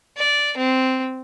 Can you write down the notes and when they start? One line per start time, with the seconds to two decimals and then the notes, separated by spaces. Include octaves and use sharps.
0.17 D5
0.57 C4